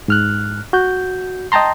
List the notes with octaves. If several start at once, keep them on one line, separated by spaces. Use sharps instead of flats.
G#2 F6 F#6
F#4 G6
D#5 G5 A5 A#5 C6